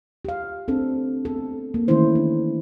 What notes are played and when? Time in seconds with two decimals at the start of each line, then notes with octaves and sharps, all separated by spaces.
0.25 G4 F5
0.68 C4 D4 A4
1.25 B3 A4
1.74 A#3
1.88 D#3 E3 A3 C#4 E4 C5
2.15 D4